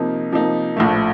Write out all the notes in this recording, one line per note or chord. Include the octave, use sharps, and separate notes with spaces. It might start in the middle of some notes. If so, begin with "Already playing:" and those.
Already playing: C3 F3 A#3 D#4
C3 F3 A#3 D#4
A#1 A2 F3 A3